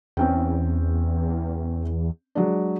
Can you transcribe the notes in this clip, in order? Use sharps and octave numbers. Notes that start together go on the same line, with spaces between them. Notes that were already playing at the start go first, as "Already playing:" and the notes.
E2 C4 C#4 G5
F#3 G#3 D4